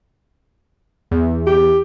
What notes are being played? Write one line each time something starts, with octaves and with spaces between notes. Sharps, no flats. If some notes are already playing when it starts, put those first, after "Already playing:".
E2
G4